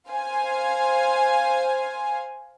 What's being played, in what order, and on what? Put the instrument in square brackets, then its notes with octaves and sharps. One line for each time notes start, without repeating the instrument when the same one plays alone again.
[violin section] C5 F5 G#5